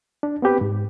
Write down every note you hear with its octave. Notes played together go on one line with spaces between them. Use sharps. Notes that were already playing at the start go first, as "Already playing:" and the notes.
D4
B3 C4 G4 B4
G#2